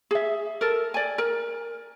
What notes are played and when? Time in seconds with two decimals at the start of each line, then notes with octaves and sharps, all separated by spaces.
0.11 G#4 E5
0.61 A4 A#4
0.94 D5 G#5
1.18 A#4